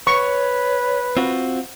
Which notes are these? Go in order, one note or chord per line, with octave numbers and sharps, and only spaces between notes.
B4 C#5 C#6
C4 F4 F#4